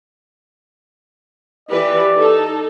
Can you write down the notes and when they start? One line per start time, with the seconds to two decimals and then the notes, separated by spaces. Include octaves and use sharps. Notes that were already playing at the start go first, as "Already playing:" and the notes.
1.70 E3 G4 B4 D5
2.16 D#4 A4